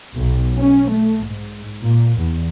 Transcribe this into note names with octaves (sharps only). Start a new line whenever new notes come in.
B1
C#4
A3
G#2
A#2
E2